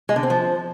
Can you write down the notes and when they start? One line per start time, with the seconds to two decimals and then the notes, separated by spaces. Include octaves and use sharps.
0.09 G#3
0.16 D3
0.23 C4
0.30 F3